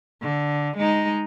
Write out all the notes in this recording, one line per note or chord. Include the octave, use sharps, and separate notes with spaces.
D3
G#3 D#4